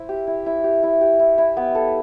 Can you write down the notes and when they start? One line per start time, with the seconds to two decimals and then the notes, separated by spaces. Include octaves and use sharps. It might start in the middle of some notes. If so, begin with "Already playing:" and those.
Already playing: E4 C5
0.09 G4
0.27 E4
0.46 E4
0.64 G4
0.83 E4
1.01 G4
1.19 E4
1.38 E4
1.57 B3
1.75 A4